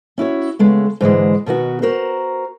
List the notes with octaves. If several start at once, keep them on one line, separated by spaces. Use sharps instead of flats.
C#4 E4 F#4 C#5
C#3 G#3 A3 B3
G#2 D3 E3 G#3
B2 D#3 B3 F#4
F#4 A#4 C5